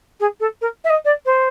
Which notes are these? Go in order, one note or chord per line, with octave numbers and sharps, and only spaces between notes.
G#4
A4
A#4
E5
D#5
D5
C5